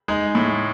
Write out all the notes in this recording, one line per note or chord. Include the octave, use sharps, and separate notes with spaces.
G#3 D#4
A2